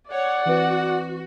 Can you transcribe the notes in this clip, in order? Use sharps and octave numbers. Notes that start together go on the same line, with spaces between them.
C#5 D5 F#5
E3 C4 F#4 B4